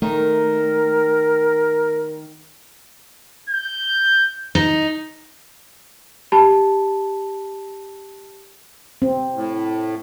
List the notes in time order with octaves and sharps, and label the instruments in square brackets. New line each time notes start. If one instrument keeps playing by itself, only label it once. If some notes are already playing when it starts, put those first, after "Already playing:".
[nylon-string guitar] D#3 [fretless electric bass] A3 [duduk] A#4
[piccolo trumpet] G6
[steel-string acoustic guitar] D#4
[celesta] G4 A5 B5
[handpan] C4
[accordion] A2